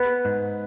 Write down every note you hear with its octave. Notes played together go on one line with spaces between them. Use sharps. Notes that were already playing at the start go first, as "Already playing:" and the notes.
Already playing: B3 B4
G#2